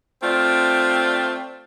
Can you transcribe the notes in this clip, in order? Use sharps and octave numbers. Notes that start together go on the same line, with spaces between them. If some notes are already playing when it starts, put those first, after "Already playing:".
A3 C4 F4 D5